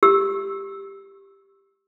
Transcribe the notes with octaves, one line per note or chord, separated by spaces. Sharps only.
G4 E6